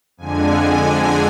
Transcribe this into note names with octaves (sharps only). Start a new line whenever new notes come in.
F2 D3 G#3 G#5